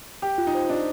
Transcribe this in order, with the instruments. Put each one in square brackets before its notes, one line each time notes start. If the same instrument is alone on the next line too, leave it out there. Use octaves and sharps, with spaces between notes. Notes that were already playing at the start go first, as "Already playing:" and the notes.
[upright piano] G4 [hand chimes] G5
[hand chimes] F4
[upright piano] D#4
[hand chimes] C5
[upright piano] D4 [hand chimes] D#5